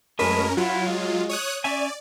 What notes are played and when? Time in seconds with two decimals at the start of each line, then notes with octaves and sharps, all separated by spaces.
0.19 F#2 G#3 A3 C#4 A#4 B4
0.57 F#3 E4 F4 F#5
0.87 G#3
1.29 C#5 D#6 F#6
1.64 C#4 D5 E5 G#5